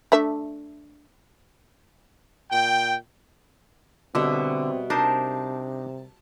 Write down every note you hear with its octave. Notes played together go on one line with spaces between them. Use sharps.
A3 D4 E5
A#2 G5
B2 D3 G3 C4 E5
C3 D4 D#4 A#4 C5 A5